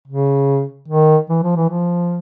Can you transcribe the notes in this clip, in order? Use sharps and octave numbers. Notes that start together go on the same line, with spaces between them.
C#3
D#3
E3
F3
E3
F3